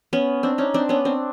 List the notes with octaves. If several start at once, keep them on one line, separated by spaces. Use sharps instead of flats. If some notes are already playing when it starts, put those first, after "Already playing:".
B3 C#4
C4 D4
C#4 D#4
C4 D4
B3 C#4
C4 D4